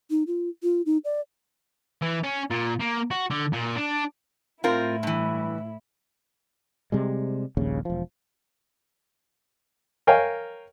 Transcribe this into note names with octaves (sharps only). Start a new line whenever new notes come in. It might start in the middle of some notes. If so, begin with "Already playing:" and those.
D#4
F4
F4
D#4
D5
E3
C#4
A#2
A#3
F#4
D3
A#2
D4
A2 C4 E4 F4 A#4
G2 E3
C3 G3 G#3
D#1 A#1 D#2 C#3
E1 F3
A#4 C#5 F5 G5 G#5